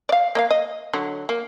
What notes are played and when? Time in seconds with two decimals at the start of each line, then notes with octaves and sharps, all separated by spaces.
0.09 D5 F5
0.35 A#3 D#5 F5
0.51 D#5
0.93 D3 F#3
1.29 A#3